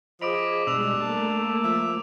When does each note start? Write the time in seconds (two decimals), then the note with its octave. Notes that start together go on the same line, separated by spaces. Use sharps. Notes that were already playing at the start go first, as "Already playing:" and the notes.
0.21 F3 G#4 D#5 B5 D6 D7 F7
0.67 B2 G3 G#3 D4 E6 F7
1.01 A3 A#3 A5
1.64 F3 E5